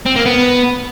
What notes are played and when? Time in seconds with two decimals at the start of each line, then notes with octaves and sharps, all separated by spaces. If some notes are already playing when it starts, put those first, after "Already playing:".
0.06 C4
0.16 A#3
0.26 B3